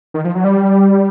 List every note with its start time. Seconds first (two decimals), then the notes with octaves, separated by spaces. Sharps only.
0.14 D#3
0.24 F3
0.35 F#3
0.44 G3